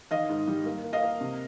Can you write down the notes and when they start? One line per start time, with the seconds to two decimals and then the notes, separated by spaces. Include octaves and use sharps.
0.11 D#3 D#5 F5
0.29 G#2
0.48 G3
0.65 A#3
0.84 A#3
0.93 D#5 F5
1.03 A#3
1.21 C3